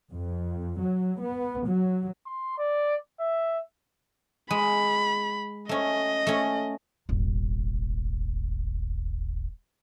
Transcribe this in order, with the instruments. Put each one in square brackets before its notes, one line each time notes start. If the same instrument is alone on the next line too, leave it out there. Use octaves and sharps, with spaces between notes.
[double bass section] F2
F#3
B3
F#3
[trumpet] C6
D5
E5
[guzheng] G#3 [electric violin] B5
[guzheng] A3 C#4 [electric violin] D#5
[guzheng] A3 C#4
[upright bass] D#1 G#1